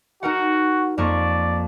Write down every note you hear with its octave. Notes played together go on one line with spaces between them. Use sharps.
D#4 F#4 A#4 F#5
F2 A#3 D5 C#6